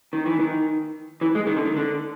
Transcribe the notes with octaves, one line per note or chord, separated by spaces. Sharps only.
D#3
E3
D#3
E3
G#3
D#3
D3
D#3
D3